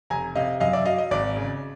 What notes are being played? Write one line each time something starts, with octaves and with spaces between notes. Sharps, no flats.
F1 G#5 A#5
C3 D#5 F5
F#2 D#5 F5
D5 E5
F#3 D#5 F5
D#5
G#1 D5
C#3